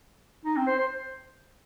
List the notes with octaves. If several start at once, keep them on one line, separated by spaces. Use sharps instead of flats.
D#4
C4
C5
C5